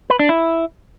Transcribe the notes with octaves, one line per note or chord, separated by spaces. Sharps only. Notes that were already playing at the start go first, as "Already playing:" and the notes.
B4
D4
E4